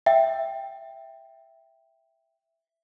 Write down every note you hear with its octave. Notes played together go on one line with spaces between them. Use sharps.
E5 G5